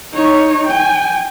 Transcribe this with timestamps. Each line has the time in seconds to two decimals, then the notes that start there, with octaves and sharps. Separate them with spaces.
0.12 D#4 C#5
0.67 G5 G#5